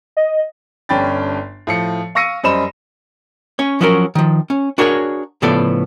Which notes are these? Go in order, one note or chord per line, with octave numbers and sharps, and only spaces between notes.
D#5
G1 C#4 D4 G5 B5 A6
A2 F3 C#7
F5 C#6 E6 A#6 C#7 D#7
F#2 G3 C5 D#5 B5 E7
C#4 C#5
F3 F#3 C#4 F#4 A4 A#4
D#3 F3
C#4
D4 F#4 G#4 A#4 C5 C#5
A2 C#3 F3 B3 A4 D5